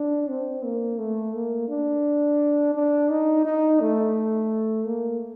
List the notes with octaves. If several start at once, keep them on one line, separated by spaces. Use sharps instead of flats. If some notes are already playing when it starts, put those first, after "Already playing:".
Already playing: D4
C4
A#3
A3
A#3
D4
D4
D#4
D#4
A3
A#3